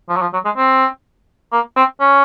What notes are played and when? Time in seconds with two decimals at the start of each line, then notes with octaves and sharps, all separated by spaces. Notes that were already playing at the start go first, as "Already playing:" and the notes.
0.09 F3
0.17 F#3
0.22 F3
0.33 F#3
0.45 G#3
0.57 C4
1.53 A#3
1.76 C4
2.01 C#4